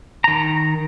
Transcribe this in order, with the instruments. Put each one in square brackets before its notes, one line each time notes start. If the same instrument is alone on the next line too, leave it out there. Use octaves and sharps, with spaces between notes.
[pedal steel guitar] D#3 A#5